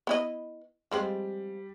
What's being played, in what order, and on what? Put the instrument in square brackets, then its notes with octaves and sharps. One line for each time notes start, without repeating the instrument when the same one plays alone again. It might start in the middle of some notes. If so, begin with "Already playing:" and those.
[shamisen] B3 E4 D#5
[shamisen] F3 G#3 C4 [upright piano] G3